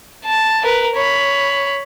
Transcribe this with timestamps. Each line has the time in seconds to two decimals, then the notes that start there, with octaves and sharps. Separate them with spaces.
0.25 A5
0.64 A#4 B4
0.95 C#5 B5